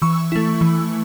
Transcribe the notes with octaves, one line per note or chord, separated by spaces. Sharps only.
E3 C#6 E6
A3 E4
E3